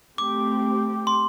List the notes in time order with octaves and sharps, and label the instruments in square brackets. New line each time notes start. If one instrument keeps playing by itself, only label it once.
[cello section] A3 C4 G4 [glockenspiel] D6
[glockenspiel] C6